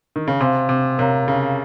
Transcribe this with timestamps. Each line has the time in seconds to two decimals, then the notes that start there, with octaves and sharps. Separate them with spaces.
0.16 D#3
0.27 C#3
0.40 C3 C5 F5 G#5 C6
0.69 C3
0.98 C3 A#4 C#5 F5 A#5
1.28 C#3